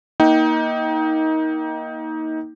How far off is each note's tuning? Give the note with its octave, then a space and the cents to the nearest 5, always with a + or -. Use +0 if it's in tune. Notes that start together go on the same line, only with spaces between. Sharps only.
A#3 +20 D#4 +25 G5 -20